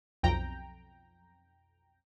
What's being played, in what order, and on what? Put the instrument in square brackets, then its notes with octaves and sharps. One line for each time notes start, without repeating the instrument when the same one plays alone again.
[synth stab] B1 F2 G5 A#5